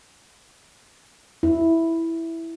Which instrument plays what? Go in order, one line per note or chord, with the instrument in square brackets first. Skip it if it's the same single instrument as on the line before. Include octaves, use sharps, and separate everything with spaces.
[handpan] E4